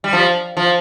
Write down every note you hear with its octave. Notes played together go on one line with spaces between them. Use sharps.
G3
F3
F3